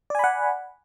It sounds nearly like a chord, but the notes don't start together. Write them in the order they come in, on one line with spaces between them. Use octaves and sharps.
D5 G#5 B5 F#5